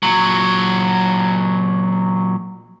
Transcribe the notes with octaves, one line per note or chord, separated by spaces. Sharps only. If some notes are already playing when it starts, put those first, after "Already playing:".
A#2 F#3